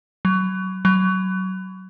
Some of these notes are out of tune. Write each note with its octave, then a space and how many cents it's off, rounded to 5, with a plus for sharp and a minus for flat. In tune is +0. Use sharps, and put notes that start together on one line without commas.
F#3 +25
F#3 +25